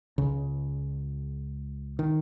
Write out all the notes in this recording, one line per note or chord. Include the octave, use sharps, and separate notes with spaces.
C#2 C#3
D#3